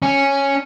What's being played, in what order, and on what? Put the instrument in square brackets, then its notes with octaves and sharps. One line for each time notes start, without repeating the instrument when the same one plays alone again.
[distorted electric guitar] C#4